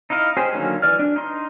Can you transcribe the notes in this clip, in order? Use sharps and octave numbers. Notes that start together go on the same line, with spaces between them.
D#4 E4 D#5 F5
C#4 G4 G#4 C5
D3 D#3 F#3 A#3 C#4
E3 D5 F6
D4
D#4 C6